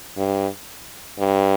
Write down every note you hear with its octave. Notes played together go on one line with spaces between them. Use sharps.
G2
G2